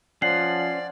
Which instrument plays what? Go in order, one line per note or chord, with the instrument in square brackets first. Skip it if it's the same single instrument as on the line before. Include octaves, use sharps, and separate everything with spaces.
[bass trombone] F3 [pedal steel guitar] C#4 F#5 [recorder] D5 [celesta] C7